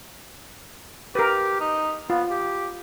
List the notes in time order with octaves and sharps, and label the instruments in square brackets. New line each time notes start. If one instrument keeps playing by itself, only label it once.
[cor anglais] G4 [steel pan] A#4 B4
[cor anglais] D#4
[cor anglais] B3 [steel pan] F4
[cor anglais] G4